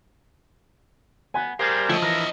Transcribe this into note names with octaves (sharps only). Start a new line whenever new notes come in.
B3 G#5
G3 G4 G#4 A#4 C5 F5
F3 A3 E4 C#5 D#5 G5
E3 A#4